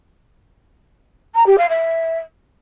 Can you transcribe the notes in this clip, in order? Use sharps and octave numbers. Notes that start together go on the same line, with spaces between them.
A#5
G4
F5
E5